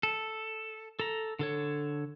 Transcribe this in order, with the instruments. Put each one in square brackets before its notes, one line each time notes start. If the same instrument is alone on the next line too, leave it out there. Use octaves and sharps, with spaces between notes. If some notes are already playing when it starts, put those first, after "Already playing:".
[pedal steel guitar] A4
A4 A#5
D3 A4 C#5